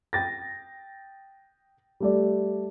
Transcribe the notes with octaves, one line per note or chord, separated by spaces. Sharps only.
G5 A6 A#6
G3 A3 D5